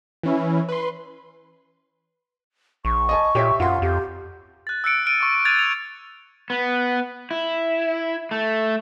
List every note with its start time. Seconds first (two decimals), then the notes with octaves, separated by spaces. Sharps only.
0.23 E3 C#4 E4
0.69 B4 C6
2.85 A#1 C#6
3.09 D#5 G#5 A5
3.35 A#2 G4 C#5 E5
3.60 F#2 F4 F#5 C6
3.82 F2 G4
4.67 F#6 A6
4.84 E6 F#6 A6 C#7 D7
5.06 F6 D7 D#7
5.21 C#6 D6
5.45 F#6 G#6 A6 D#7 F7
5.59 F7
6.50 B3
7.31 E4
8.31 A3